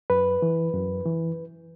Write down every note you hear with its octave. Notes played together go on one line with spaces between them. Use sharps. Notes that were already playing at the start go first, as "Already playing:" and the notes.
F#2 B4
E3
F#2
E3